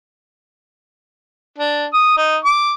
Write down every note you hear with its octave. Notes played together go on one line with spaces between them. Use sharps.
D4
D#6
D#4
D6